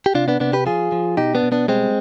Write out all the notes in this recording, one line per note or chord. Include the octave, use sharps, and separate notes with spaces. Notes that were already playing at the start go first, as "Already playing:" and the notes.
G4
C3 D4 F4
B3 D4
C3 B3 D4
G4 B4
F3 F4 G#4
F3
B2 D#4 G4
B3 D4
B2
B3 D4
G3 G#3 C4